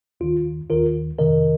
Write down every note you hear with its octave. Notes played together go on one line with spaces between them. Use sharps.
D#2 D#3 F4
D#2 D#3 F4 A#4
F2 C3 D#3 A#4 D#5